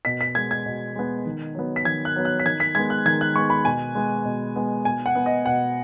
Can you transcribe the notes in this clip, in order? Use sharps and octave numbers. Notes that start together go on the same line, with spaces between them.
B2 B6
B6
G#3 B3 G#6
G#6
B2
G#3 B3
D#3
F#3 B3
B6
D#3 G#6
F#6
F#3 B3
F#6
B6
D#3 G#6
B6
G#3 B3 G#6
F#6
D#3 G#6
F#6
G#3 B3 C#6
B5
B2 G#5
G#3 B3
B2
G#3 B3
B2 G#5
F#5
B3
D#5
B2 F#5